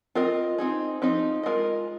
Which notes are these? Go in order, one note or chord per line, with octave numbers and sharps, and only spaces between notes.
C4 F4 A#4 D#5
C4 D#4 G#4
F3 C4 D#4
G#3 F4 A#4 D#5